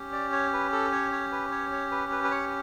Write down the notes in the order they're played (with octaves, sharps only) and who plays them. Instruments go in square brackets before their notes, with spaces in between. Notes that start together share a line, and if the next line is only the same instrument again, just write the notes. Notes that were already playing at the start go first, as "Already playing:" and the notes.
Already playing: [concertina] C#4 G4
D5
C#5
B4
A4
C#5
C#5
B4
C#5
C#5
B4
B4
B4
C#5